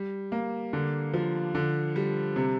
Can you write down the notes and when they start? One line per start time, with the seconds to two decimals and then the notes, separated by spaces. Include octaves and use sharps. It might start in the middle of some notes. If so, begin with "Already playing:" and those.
Already playing: G3
0.32 A#3
0.73 D3
1.14 F3
1.55 D3
1.96 G3
2.36 C3